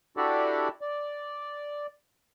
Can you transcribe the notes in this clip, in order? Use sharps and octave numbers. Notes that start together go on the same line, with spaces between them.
D4 E4 F#4 G4 A4 D5
D5